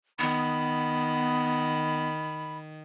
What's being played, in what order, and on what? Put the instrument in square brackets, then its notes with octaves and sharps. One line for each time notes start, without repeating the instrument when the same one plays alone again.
[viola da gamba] D#3 [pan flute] B3 [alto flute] B5